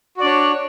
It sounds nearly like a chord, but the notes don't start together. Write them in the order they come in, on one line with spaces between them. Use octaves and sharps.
F#4 D5 D4 C#5